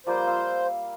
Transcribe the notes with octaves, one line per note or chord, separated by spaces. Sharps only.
F3 G3 A#3 C5
F5 E6